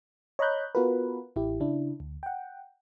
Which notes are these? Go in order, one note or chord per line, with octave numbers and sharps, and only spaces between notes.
C#5 D#5 A#5 B5 F#6 G6
B3 F4 F#4 A#4 B4
A1 E4 G4
C#3 D4 E4
D2
F#5 G5